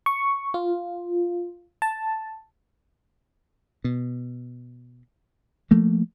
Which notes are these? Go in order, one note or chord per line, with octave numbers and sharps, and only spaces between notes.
C#6
F4
A5
B2
F3 A3 A#3